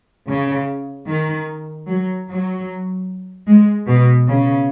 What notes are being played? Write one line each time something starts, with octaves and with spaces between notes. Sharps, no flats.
C#3
D#3
F#3
F#3
G#3
B2
C#3